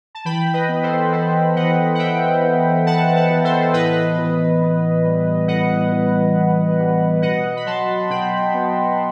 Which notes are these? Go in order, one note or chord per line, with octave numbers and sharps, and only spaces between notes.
A5
E3 G5 B5
B4 D#5
B3
A4 C5
B3 A4 C5
E3 D#5 F#5
F#5
E3 E5 G5
B3
B3 F#5 A5
F#5 A5
E3
A4 C5
A2 B4 D#5
E3
B3
G3
A2 D#5 F#5
E3
B3
G3
B2 D#5 F#5
B5
F#3 A5 C6
B2 G5 B5
B3